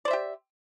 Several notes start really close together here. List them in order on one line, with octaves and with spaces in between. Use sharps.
D5 C5 E5 G4